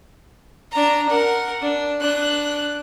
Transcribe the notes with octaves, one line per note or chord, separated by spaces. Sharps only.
D4 A#5
A#4 F#5
D4
D4 F#6